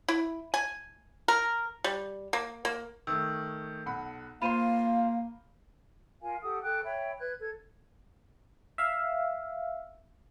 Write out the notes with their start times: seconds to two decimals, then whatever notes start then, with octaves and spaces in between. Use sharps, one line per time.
0.08 E4
0.54 G#5
1.28 A#4
1.84 G3
2.33 A#3
2.65 A#3
3.07 D#3 A3 E6
3.86 B1 F#5 B5
4.42 A#3 F4 C5 F5 B5 C6 D#7
6.21 F4 A#4 F5 G#5
6.42 G4 A4 F#5 D#6
6.62 A4 G5 D6 F#6
6.83 C#5 E5 G5 B5
7.18 B4 F#6 G#6
7.39 A4 G#6
8.78 E5 F5